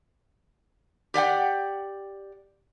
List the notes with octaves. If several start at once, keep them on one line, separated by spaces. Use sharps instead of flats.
G4 D5 F#5 G5